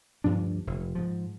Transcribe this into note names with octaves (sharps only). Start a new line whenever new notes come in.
D2 G2 F3 D4
F1
G#2 F3